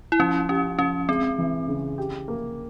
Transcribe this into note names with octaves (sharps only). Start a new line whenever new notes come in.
E4
F3 C#4
C#4 G4
F3 C#4
G#3 C4
E3
C#3
G4
A#3